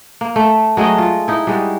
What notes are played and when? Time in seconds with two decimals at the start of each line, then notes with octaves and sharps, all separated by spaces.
0.21 A#3
0.36 A3
0.77 F#3 G#3 A3 D#5
0.98 F4
1.28 D#4 E4
1.47 G3 G#3 F#4